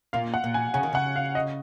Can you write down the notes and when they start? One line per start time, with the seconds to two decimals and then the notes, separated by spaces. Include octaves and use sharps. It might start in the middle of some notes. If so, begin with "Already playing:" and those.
0.13 A#2 F5
0.34 F#5
0.44 A#2
0.54 G#5
0.74 C#3 G#5
0.83 D#3
0.93 C#3 F#5
1.16 F5
1.35 D#5